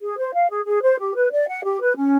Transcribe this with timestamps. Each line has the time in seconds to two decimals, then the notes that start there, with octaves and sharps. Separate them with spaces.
0.01 G#4
0.18 C5
0.33 F5
0.50 G#4
0.66 G#4
0.83 C5
0.99 G4
1.15 B4
1.32 D5
1.48 F#5
1.64 G4
1.80 B4
1.96 C#4